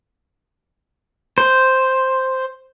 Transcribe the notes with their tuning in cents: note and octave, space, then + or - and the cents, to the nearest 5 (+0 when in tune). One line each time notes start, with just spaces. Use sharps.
C5 +0